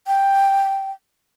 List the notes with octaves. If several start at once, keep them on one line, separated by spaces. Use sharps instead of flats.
G5